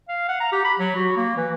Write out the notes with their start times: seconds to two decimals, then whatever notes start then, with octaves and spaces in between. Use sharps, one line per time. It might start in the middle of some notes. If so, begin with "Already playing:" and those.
0.09 F5
0.28 F#5
0.40 A#5
0.52 G4
0.64 B5
0.79 F#3
0.96 F#4
1.16 A#3
1.37 E3